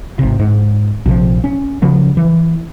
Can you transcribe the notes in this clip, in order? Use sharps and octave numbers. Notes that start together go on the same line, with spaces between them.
G#1 C3
G#2
A#1 C3 F3
C#4
C#3 F3 F#3
E3